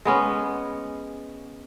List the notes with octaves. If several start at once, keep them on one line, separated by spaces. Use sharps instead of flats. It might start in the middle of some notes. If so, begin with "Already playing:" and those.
G#3 B3 C#4